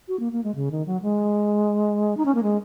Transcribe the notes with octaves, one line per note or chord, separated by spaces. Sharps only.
F#4
A#3
A#3
G#3
C#3
D#3
F#3
G#3
D#4
C#4
A#3
G#3